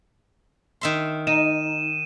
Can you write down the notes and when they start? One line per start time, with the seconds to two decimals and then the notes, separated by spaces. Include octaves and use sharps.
0.81 D#3 E5 C6
1.27 D#4 D#7 E7